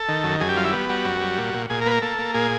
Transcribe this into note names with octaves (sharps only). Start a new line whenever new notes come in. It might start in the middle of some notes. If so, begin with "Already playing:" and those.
Already playing: A4
D#3
F#2
F#2 G#4
G4
G3 F4
E4
B3
G3 F#4
F#2
G3
A#2
A#2
A#2 G#4
A#4
A#3 B4
A#4
A#3 A4
A#3
A#2 G#4